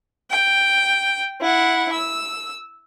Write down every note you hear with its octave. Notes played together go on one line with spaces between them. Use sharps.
G5
E4 F#5
E6